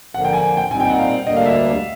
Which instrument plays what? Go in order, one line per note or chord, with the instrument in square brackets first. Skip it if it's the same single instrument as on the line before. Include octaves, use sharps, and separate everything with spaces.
[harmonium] D3 F3 A#3 [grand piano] F#5
[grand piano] G5
G#5
G5
[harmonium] A#2 G3 C4 D#4 [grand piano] G#5
[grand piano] G5
F#5
F5
[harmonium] D2 D3 G3 A#3 D4 [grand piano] D#5
[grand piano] F5
E5